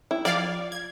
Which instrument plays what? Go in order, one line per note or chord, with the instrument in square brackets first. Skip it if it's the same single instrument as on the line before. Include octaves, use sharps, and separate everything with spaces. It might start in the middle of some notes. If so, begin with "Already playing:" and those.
[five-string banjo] E4
[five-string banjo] F3 [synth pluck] D5 F5
[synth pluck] G#6